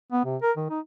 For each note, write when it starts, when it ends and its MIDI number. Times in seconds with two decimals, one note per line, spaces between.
0.13 0.24 59
0.25 0.37 48
0.42 0.52 70
0.57 0.66 51
0.70 0.80 63